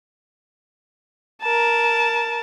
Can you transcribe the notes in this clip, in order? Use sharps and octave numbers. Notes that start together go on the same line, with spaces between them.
A#4 A5